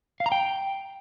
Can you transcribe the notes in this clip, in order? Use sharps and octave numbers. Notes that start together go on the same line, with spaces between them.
F5
A#5
G5